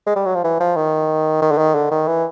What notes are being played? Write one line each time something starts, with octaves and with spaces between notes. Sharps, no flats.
G#3
G3
F#3
F3
E3
F3
D#3
D#3
D3
D#3
D3
D#3
E3